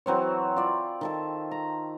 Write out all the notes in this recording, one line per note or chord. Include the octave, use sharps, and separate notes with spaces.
E3 F#3 C4 C#5
F4 D5
D#3 A4 A5
A#5